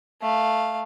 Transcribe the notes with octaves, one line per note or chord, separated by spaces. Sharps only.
A3 F5